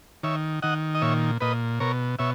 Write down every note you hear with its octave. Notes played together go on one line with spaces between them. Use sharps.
D#3 C#5 E5
D#3 D#5 F#5
D#5
A#2 C#5 E5
A#2 B4 D#5
B2 A#4 C#5
B2 C#5 E5